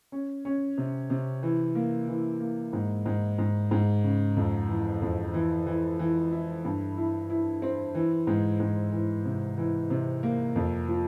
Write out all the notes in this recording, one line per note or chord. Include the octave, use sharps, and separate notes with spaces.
C#4
C#4
C3
C3
E3
A#3
E3
A#3
G#2
G#2
G#2
G#2
C#3
F2
E3
F2
E3
E3
E3
E4
G2
E4
E4
C4
E3
G#2
G#2
E3
C3
E3
C3
A#3
F2
F3